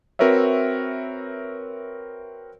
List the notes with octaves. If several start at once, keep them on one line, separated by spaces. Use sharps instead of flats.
C4 F#4 A#4 B4 C#5 E5